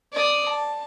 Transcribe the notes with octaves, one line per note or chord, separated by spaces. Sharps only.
D5 D#6
A5